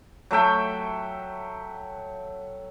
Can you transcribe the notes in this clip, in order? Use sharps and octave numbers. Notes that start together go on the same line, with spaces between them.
F#3 A3 E5 G5